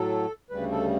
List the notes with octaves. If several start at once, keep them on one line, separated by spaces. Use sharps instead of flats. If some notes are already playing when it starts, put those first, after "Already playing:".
Already playing: A2 F#3 A4
D2 C#3 G3 B4
A4